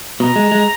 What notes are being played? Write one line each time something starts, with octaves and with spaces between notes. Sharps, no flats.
B2 A#5
G#3
G#3